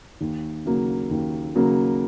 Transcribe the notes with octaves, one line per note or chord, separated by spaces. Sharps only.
D#2
C#3 F#3 A#3
D#2
C#3 F#3 A#3